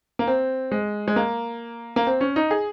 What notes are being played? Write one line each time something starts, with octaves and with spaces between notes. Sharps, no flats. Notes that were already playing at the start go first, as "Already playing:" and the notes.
A#3
C4
G#3
G#3
A#3
A#3
C4
C#4
D#4
G#4